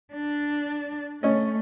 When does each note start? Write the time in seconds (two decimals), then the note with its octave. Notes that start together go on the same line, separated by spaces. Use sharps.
0.14 D4
1.23 A3 C#4 D#5